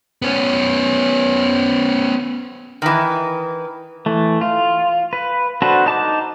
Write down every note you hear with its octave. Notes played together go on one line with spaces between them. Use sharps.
B3 C#4
D#3 E3
E3 A3
F4
B4
D4 F#4 A4 B4 C5
D#4 A5 D6